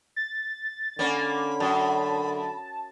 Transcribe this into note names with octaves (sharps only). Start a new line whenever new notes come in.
A6
D3 A#3 C#4 B5
F#2 A5